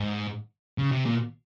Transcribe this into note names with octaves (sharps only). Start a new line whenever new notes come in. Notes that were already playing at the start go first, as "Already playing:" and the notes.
Already playing: G#2
C#3
C3
A#2